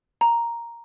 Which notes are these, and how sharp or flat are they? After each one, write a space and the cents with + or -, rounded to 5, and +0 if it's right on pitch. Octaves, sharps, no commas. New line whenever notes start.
A#5 +5